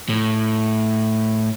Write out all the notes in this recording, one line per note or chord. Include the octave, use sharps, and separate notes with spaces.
A2